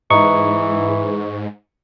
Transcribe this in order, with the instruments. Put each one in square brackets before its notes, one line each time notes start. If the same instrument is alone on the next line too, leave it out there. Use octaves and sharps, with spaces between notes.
[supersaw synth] G#2 [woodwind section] E3 [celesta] D#5 A#5 D#6 [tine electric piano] C#6